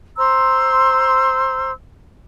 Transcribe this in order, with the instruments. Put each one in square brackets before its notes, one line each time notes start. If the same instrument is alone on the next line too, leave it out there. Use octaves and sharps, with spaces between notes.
[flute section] C5 A#5 C6 E6